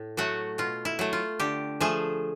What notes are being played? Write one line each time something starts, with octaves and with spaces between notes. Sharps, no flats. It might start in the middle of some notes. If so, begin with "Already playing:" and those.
Already playing: A2
F#3 A3 F#4
B2 F4
E4
F#3 A3
F4
D3 G4
F3 A3 G#4